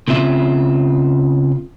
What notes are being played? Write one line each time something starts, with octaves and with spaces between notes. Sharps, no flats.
C#3 C4 F4 E5